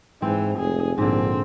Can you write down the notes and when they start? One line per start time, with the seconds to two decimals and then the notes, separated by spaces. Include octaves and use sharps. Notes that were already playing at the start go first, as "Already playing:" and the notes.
0.22 G#2 E3 C4 C5
0.58 F1 G#4
0.98 A#1 G#2 D3 C4